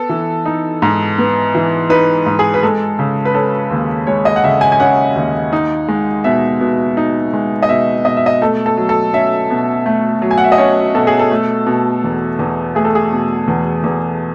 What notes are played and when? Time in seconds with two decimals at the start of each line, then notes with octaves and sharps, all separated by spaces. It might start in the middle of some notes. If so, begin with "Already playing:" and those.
Already playing: B3 A4
0.09 E3
0.46 D#4
0.82 G#2
1.18 B3
1.55 E3
1.90 D#4 B4
2.26 G#2
2.39 G#4
2.54 B4
2.63 G#3 A4
2.99 C#3
3.25 B4
3.34 C#4 A4
3.70 D#2
4.07 G#3 C#5
4.25 D#5
4.36 F#5
4.44 C#3 E5
4.61 G#5
4.72 G#5
4.80 C#4 F#5
5.15 D#2
5.53 D#4
5.88 G#3
6.24 B2 E5
6.61 B2
6.97 D#4
7.34 G#3
7.63 D#5
7.69 B2 E5
8.05 B2 D#5
8.17 E5
8.26 D#5
8.42 A3 A4
8.66 A4
8.77 F#3
8.89 A4
9.14 C#4 E5
9.50 B2
9.86 A3
10.22 F#3
10.31 G#5
10.38 F#5
10.44 E5
10.52 D#5
10.58 C#4 C#5
10.95 B2 A4
11.07 G#4
11.19 A4
11.31 A3
11.67 B2
12.04 E2
12.39 E2
12.75 A3 G#4
12.85 A4
12.95 G#4
13.12 B2
13.48 E2
13.84 E2